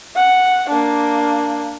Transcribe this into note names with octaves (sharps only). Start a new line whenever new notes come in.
F#5
A#3 D4